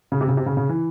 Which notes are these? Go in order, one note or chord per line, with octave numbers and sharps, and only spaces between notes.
C#3
C3
C#3
C3
C#3
C#3
E3